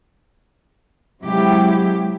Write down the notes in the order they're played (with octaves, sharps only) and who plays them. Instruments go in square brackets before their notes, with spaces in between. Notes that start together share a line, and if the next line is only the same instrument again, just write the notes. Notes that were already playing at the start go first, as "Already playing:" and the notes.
[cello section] C3 F#3 G#3 E4 G4